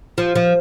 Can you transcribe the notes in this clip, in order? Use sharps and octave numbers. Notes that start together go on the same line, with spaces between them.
F3
F3